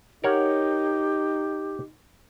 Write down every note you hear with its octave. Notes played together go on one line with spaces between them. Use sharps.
D#4 G4 A#4 C#5 F#5